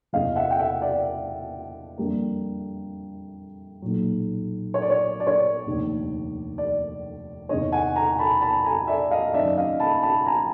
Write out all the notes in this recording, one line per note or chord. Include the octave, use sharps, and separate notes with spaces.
E2 C3 E3 D#5 F5
E5 F#5
G5
E5 F#5
D5 E5
F2 D3 G3 A#3
B1 A#2 F#3
C#5
D5
C#5
D5
C#5
D5
F1 D#2 D3
D5
E2 C3 D#3 C#5 D#5
F#5 G#5
G#5 A#5
A5 B5
A5 B5
G#5 A#5
D5 E5
D#5 F5
F#1 F#2 D#3 D5 E5
D#5 F5
A5 B5
A5 B5
G#5 A#5